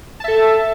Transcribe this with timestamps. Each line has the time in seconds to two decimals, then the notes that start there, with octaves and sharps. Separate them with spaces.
0.20 A5
0.24 E5
0.28 A4